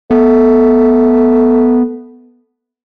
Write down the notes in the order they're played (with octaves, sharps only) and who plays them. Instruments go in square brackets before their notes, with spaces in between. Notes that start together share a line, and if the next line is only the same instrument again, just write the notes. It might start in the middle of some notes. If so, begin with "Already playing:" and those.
[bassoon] A3 [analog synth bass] B3